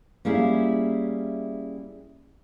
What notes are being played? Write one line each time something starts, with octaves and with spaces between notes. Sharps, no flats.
G3 A#3 C#4 E4 G#4 E5